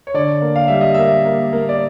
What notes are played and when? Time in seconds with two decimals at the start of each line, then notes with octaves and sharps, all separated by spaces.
0.07 C#5
0.14 D3 D5
0.41 A#3
0.56 F5
0.68 G3 E5
0.81 D#5
0.94 A#3 E5
1.25 A#3
1.52 A#3
1.69 D5